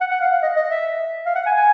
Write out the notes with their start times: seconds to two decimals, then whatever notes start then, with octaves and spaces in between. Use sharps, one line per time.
0.01 F#5
0.11 F#5
0.21 F5
0.32 F5
0.42 D#5
0.56 D#5
0.70 E5
1.26 F5
1.35 F#5
1.46 G#5
1.57 G#5